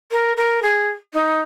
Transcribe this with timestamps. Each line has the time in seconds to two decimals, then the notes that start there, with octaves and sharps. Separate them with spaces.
0.11 A#4
0.37 A#4
0.62 G#4
1.13 D#4